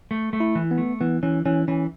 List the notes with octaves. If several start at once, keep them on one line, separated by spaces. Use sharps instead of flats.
A3
A3
E4
E3
B3
A3
E3 B3
E3 C#4
E3 C#4
E3 C#4